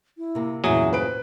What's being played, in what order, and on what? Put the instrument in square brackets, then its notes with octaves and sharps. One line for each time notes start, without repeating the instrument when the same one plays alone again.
[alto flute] E4
[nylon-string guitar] C3 A#3
[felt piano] E2 [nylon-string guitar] G2 A#2 C#3 [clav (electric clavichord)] F#3 G#4 [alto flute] E5
[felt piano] B4 D7 [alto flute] C5